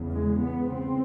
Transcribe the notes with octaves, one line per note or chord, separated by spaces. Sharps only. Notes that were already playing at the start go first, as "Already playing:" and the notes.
Already playing: E2 C#3
G#3
B3
C#3 C4